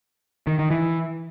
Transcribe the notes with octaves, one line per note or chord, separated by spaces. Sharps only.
D#3
D#3
E3